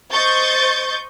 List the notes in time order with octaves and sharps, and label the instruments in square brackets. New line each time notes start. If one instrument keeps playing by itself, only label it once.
[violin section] C5 D#5 C#6 G6 A6